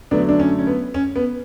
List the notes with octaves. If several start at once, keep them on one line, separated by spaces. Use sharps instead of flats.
D3 F#3 A3 B3 D4
D4
C#4
C#4
B3
C#4
B3